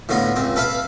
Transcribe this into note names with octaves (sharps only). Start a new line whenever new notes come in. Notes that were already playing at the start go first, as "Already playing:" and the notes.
A2 D3 B3 F4
C#2 C4
A4 B4 E5 F5